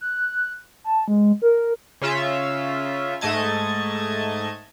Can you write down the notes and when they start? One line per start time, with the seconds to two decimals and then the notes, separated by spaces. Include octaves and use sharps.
0.01 F#6
0.84 A5
1.08 G#3
1.42 A#4
2.02 C#3 C#4 F4 E5
3.21 G#2 A3 D#5 A5 G#6